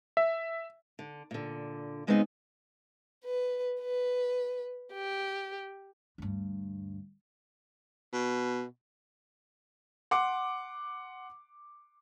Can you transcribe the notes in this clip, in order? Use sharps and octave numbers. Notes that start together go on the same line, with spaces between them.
E5
D3
A#2 D3
C#3 G#3 B3 C4 D4 D#4
B4
B4
G4
D2 G2
B2
F#5 C6 D6